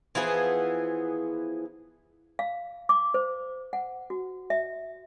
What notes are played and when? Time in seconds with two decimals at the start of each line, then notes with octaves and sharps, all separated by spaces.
0.15 E3 F3 B3 G#4
2.39 F5
2.89 D6
3.14 C5
3.73 F#5
4.10 F#4
4.50 E5